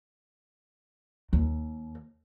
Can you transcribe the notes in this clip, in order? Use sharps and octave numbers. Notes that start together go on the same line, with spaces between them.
D#2